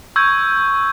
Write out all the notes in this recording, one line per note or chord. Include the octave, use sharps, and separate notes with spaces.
C#6 E6 G6 G#6